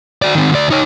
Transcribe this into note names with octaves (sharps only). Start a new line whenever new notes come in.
F#4 D5
D#3 C4
D2 D5
D#4 C#5